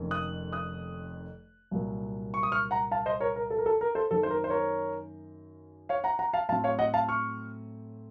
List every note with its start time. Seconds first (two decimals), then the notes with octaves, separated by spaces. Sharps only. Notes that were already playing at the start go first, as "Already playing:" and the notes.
Already playing: F1 F2 D#3 A#3 C#4
0.11 D#6 F#6
0.52 D#6 F#6
1.71 C2 A#2 F#3 A#3
2.34 C#6
2.43 D#6
2.52 C#6 F6
2.71 F#5 A#5
2.91 F5 A5
3.06 C5 D#5
3.20 A#4 C#5
3.36 A#4
3.50 A4
3.58 A#4
3.66 A4
3.81 A#4
3.95 A4 C5
4.11 F#2 D#3 A#3 A4
4.23 C5
4.31 A#4
4.44 C5
4.50 A#4 C#5
5.89 C#5 F5
6.04 F#5 A#5
6.19 F#5 A#5
6.33 F5 A5
6.49 A2 F#3 C4 F5 A5
6.64 C#5 F5
6.79 D#5 F#5
6.94 F5 A5
7.09 C#6 F6